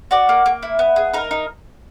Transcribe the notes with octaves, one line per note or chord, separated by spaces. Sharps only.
F#4 D5
A#3
A#3
E4
B3
G#4
D#4 A#4
D#4